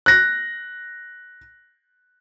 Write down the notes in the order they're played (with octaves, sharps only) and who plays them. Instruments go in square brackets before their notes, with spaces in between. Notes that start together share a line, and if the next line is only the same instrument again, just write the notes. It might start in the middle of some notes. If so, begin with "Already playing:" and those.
[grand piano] F#6 A#6